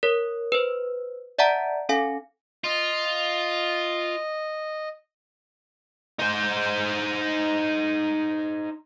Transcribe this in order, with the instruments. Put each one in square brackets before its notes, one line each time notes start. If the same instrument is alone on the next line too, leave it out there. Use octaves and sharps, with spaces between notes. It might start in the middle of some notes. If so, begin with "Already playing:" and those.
[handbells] A#4 C#5
B4 C5
D5 E5 F#5 A5 A#5
C#4 A4 F5 G#5
[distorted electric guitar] F4 [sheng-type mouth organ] D#5
[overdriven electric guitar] D#4 C5